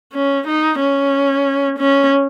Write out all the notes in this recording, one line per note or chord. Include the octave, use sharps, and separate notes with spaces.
C#4
D#4
C#4
C#4